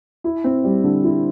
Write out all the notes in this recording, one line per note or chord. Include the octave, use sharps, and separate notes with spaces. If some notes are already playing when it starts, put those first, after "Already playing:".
E4
C4
G3
D3
E4